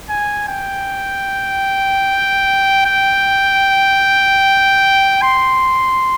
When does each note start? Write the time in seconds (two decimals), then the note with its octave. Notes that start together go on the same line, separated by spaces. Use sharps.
0.10 G#5
0.48 G5
2.86 G5
5.22 C6